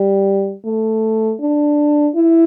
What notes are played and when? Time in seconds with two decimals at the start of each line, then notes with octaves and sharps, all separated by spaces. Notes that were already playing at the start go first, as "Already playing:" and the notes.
Already playing: G3
0.65 A3
1.40 D4
2.15 E4